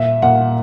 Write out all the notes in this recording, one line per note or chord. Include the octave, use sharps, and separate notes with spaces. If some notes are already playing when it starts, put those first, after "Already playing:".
Already playing: A#2 E5
A#2 F#5